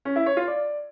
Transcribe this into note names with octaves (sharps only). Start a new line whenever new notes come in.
C#4
E4
C#5
F4
D5